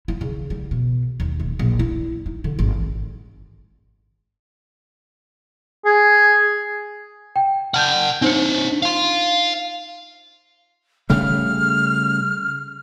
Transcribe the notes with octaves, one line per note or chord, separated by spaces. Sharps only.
E4
C#3
G3
B2
D#2
D#1
A#1
E4
D#4
D3
G#1
G#4
G5
F#5 A5 F6 G6
C4 D4 D#4 C5 C#7
F5 C6
C#3 G3 A3 F6